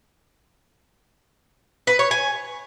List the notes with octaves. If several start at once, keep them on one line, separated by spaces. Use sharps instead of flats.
B4
C#5
G#5